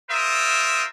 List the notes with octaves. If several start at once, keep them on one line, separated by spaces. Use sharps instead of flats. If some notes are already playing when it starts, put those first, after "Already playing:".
F4 A#4 C5 E5 D#6